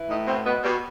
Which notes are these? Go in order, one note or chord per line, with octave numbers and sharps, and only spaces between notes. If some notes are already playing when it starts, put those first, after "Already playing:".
Already playing: E3
A2 D#4
B2 C4
B2 B3
B2 G3